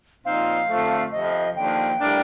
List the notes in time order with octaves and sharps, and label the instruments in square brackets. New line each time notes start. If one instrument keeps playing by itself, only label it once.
[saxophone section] A#2 F3 C4 D#4 [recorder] F5
[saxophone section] F2 D3 F3 A3
[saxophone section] F2 C3 F3 [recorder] D#5
[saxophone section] D#2 D3 F3 [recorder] G5
[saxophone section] A2 G3 A#3 D4